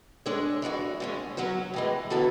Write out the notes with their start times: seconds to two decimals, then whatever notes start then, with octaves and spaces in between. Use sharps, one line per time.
0.26 G#3 D4 A4 C#5
0.62 E3 G#3 D4 F#4
1.00 D3 G#3 C#4
1.37 F#3 C#4 F#4 C#5
1.74 A2 E3 G#3
2.10 D3 F#3 B3 E4 A4